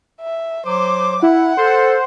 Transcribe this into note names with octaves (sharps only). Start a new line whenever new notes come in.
E5
F#3 C5 D6
E4 F#5
A4 C5